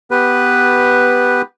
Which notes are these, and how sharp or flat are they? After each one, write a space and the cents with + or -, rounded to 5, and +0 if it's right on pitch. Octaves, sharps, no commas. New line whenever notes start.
B3 +0 G4 +0 B4 +0